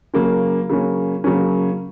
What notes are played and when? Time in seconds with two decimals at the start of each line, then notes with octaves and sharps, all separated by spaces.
0.14 C#3 F#3 A#3 C#4
0.69 C#3 F#3 A#3 C#4
1.24 C#3 F#3 A#3 C#4